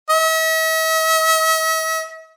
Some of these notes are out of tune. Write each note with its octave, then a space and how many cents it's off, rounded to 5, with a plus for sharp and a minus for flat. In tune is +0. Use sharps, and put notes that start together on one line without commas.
E5 -45